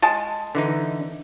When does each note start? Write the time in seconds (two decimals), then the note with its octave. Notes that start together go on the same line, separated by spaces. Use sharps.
0.02 G#3 G#5 A5
0.55 D3 E3 D#4